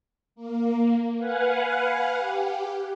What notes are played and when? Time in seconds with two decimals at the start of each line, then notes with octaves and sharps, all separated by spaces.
0.35 A#3
1.18 B4 F5 F#5 G#5
2.17 G4